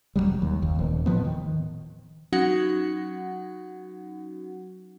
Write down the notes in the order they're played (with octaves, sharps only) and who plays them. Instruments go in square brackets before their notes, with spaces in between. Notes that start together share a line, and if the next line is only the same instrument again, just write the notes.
[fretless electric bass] E1 F2 F#3 G3
D#2
F#1 D#2
D#1
A2 D#3 F3 B3
D#3
[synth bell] F#3 C#4 D#4 F#4 F#5